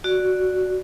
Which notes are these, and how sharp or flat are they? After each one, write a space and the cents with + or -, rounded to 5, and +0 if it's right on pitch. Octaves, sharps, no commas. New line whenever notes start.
F#4 +0 D5 +0